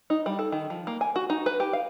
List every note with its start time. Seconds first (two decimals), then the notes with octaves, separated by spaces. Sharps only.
0.10 D#4
0.26 G3
0.39 A4
0.52 D#3
0.70 F3
0.87 A#3
1.01 G#5
1.16 F#4
1.30 D#4
1.46 B4
1.60 G4
1.73 F5